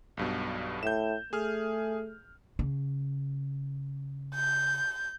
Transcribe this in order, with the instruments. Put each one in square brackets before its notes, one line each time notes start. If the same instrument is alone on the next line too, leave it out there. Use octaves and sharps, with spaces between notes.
[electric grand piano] B1 G2 B2
[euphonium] A2 [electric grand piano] G6 E7
[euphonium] A3 [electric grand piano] G#4 F6
[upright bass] C#3
[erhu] G6